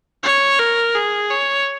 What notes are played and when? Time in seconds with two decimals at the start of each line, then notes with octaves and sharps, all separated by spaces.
0.23 C#5
0.59 A#4
0.95 G#4
1.31 C#5